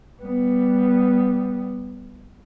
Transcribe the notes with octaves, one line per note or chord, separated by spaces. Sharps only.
G3 B3